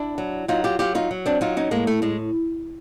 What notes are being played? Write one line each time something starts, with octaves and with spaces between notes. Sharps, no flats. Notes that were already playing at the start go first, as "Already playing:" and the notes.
Already playing: D4 E4
F#3
F#3 D#4 F4
F4 G4
F#3 F4 G4
D#4 F4
F#3
C4 D4
F#3 D#4 F4
C#4 D#4
A2 G#3 A#3
A3
A2 G#3